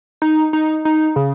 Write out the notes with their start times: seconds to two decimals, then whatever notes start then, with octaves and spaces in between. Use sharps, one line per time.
0.22 D#4
0.53 D#4
0.85 D#4
1.16 C#3